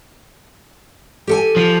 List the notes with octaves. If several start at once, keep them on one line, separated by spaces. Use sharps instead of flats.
G4 A4 G#5
F3